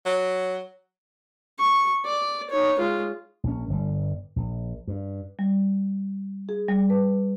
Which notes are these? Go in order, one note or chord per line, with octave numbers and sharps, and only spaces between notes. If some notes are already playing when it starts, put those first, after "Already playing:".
F#3
C#6
D5
D#4 C#5
G#3 F4
A#1 C#4
G1 C3 G3
A#1
G2
G3
G#4
G3
B4